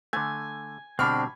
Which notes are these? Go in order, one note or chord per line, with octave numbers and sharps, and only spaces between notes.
D3 A3 G#5
B2 D3 G3 C4 D4 B5 C#6 F6